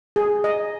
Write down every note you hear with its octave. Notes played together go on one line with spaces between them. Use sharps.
G#4
D#5